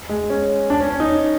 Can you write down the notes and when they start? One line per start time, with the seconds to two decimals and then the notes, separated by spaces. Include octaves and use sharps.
0.09 G#3
0.30 C#4
0.70 D4
0.80 C#4
0.90 C#4
1.00 D#4